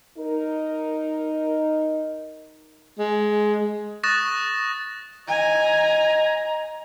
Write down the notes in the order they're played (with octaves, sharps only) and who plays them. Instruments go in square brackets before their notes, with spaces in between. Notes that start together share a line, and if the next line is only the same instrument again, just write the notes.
[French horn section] D#4 A#4
[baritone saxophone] G#3
[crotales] C#6 D#6 F#6 A6 A#6 E7
[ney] D#5 [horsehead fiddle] G#5 [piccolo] A#5